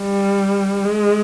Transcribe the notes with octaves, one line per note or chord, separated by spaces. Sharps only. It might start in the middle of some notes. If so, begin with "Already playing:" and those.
Already playing: G3
G#3